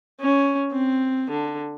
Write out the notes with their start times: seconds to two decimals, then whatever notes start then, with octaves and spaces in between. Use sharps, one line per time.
0.21 C#4
0.72 C4
1.31 D3